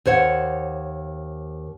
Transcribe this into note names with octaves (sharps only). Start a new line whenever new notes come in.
D#2 C5 C#5 F#5